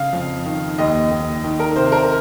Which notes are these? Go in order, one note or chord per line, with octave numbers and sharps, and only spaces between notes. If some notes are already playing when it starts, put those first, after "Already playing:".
Already playing: C#3 F5
F2
D#3
D#2 D#5
D#2
D#3
A#4
C3 C5
A#4